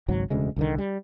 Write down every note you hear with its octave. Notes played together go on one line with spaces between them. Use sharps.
G#1 C#2 G#2 F#3
E1 D2 C#3 G#3
C2 D3 D#3
G3